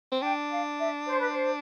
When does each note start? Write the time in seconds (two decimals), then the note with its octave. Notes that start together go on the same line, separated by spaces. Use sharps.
0.12 C4
0.22 D4 G5
0.51 F5
0.79 E5
1.07 C5
1.18 B4
1.30 C5